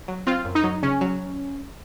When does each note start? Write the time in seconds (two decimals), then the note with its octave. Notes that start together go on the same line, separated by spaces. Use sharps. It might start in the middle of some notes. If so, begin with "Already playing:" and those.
0.08 F#3
0.27 C4 F4
0.45 F#2
0.55 D#4
0.64 F#3
0.83 C#3 C#4
1.01 F#3